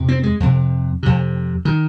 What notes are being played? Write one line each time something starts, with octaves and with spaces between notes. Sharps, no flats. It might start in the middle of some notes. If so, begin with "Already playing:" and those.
Already playing: F2 C3
C4
G#3
F2 C3
F2 C3
D#3